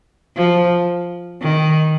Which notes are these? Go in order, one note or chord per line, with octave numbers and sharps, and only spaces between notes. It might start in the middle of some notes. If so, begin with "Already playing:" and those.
F3
D#3